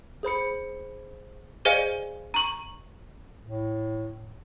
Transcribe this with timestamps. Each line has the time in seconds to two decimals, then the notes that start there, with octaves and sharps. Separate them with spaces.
0.23 G#4 C5 B5 C#7
1.65 G#4 C5 D5 D#5 F5 G#5
2.34 A#5 C#6
3.43 A2